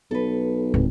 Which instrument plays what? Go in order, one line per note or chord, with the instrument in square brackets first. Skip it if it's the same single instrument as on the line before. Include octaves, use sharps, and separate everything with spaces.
[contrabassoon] B1 [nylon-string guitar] A4 B4
[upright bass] D1 [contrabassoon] G#1